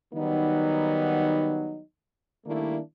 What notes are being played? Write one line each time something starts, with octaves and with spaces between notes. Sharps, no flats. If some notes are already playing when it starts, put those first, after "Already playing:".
D#3 F#3 G3 B3 D#4
D#3 G3 A3 A#3 D4 E4